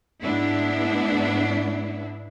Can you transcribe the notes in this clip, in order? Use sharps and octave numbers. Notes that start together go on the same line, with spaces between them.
G#2 B3 D4 E4